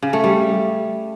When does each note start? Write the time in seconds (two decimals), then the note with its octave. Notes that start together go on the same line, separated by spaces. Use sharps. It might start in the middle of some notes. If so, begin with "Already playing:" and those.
0.02 C#3
0.13 A3
0.24 G3